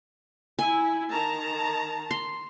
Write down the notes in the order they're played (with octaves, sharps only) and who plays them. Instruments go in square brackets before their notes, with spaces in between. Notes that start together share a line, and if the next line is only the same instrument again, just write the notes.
[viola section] E4 [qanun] G#5
[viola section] D#3 A5 A#5
[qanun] C6